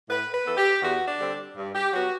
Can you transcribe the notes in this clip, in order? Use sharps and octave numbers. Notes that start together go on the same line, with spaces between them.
A2 B4
B4
E3 B3 A4
G4
E2 F#4
D4
D3 G3 C4
G2
G4
F#3 B3 F#4